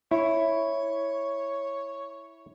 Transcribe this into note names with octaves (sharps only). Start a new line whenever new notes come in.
E4 C#5